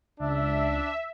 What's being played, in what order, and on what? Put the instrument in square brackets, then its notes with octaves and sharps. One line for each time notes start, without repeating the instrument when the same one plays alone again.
[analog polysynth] C#2 [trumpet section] D4 [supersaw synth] E5